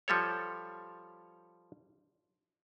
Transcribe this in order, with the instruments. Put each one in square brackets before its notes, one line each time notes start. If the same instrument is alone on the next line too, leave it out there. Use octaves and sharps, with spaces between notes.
[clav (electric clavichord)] F3 G3 A4 C#5